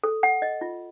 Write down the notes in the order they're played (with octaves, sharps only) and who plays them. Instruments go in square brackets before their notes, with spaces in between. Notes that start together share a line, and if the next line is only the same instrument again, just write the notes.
[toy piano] A4
F#5
D#5
F4